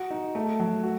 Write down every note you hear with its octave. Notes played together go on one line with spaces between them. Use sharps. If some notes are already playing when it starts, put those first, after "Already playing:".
Already playing: F#4
D#4
A3
F#3
F#4